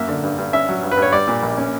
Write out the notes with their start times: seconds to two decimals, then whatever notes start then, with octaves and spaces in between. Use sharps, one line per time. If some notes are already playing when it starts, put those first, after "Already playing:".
Already playing: F#2 A#3 E5
0.09 D3
0.23 G2
0.38 G2
0.53 C#4 E5
0.69 F#3
0.83 G2
0.92 B4
0.97 G2 C#5
1.13 G3 D5
1.28 A#2
1.43 A#1
1.58 C#4